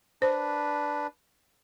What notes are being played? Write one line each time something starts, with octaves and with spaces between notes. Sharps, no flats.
D4 B4 C5